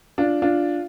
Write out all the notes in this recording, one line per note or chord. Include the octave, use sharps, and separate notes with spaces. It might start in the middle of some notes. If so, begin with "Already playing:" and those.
D4 F4
D4 F4